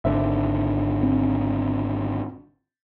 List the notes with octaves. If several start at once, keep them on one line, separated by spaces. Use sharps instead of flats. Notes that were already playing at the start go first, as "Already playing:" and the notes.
G#1 D3 C5 E5
C4